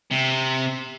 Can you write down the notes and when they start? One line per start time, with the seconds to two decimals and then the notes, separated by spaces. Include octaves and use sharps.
0.11 C3